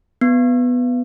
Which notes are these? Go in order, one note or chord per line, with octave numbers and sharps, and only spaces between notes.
B3